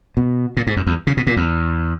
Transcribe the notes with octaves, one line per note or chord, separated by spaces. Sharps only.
B2
A#2
G#2
F#2
E2
C#3
B2
A#2
E2